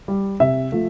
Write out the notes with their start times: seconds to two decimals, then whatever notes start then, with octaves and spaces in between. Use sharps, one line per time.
0.08 G3
0.40 C3 E5
0.72 F3 A3